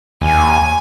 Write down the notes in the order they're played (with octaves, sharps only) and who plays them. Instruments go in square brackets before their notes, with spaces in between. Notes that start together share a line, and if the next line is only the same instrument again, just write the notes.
[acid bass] D#2 [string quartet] G#5